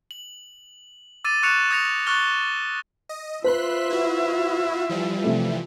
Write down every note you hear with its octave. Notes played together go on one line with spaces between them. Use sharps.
F#7
D6 E6 A6 D#7
C#6 E6 F#6 C#7 E7 F7
D#6 E6 G#6 A#6 C#7 F7
C#6 F6 F#6 A6 G7
D#5
F4 B4 C5 E5 C6 F#6 B6
E4 F#4
E3 F3 G3
C3 A3